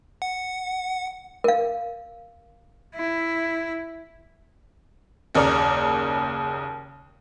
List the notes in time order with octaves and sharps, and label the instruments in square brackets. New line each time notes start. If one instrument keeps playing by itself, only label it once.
[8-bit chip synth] F#5
[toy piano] A#4 F5
[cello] E4
[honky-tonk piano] F#1 D#2 C#3 A#4 D5